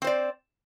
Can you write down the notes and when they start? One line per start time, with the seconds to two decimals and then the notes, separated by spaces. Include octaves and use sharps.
0.02 C4
0.04 C5
0.07 D5